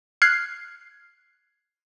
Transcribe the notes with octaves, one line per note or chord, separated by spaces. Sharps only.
F6 F#6 G#6 C7